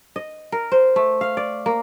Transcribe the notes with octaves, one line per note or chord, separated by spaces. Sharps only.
D#5
A#4
C5
A3
F5
D5
A#3